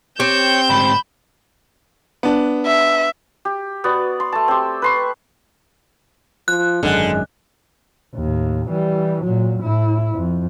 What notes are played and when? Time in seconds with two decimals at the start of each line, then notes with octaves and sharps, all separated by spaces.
0.20 C4 G4 C#5 G6 E7
0.70 D2 G#2 B5
2.23 B3 D4
2.66 E5
3.45 G4
3.84 B3 F#4 D5
4.20 C6
4.32 A3 A5
4.48 C4 G4
4.82 B4 C6 C#6
6.48 F3 F#6
6.83 G#1 F#2 D3 G#3
8.16 D#2 A2
8.70 E3 G3
9.23 A#2 F#3
9.60 A2 E4
10.15 F2